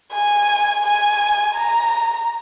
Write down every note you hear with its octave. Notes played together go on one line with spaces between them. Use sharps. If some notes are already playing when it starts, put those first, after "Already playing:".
G#5
G#5
A#5